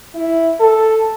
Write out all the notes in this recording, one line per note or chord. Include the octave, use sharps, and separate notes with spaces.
E4
A4